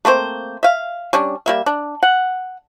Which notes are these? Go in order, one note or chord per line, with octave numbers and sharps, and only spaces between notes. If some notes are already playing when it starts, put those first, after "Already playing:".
A3 A#3 C4 C5
E5 F5
G3 C#4 D4
G3 A#3 E5
D4
F#5